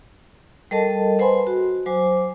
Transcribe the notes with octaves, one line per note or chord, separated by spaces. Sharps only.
G3 A4 A#4 D#5 A5
B4 C5 F#5 G#5 B5 C6
F#4
F#3 C5 G#5 D6